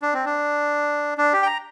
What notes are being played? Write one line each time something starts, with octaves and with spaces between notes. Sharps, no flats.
D4
C4
D4
D4
G4
G5
A#5